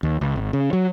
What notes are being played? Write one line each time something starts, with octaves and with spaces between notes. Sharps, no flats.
D#2
C#2
G#1
C#3
F#3